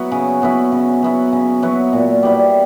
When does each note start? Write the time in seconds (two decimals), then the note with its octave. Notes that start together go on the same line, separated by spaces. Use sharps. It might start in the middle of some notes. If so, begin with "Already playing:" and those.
Already playing: F#3 B3 E4
0.12 C#3
0.42 F#3 B3 E4
0.72 C#3
1.03 F#3 B3 E4
1.32 C#3
1.63 F#3 B3 E4
1.93 A#2
2.23 G3 B3 E4